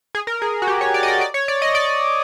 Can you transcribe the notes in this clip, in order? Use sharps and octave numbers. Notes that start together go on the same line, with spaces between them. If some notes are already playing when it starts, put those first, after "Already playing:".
G#4
A#4
G#4
F#4
G4
C#5
D5
D#5
D5
D5
C#5
D5
D#5
D5